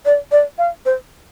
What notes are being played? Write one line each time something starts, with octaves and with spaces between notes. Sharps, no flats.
D5
D5
F5
C5